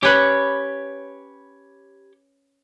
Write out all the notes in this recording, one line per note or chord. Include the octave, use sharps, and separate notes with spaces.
C#4 G4 B4 C#5 B5